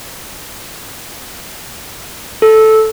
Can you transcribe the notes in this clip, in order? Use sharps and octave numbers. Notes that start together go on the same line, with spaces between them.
A4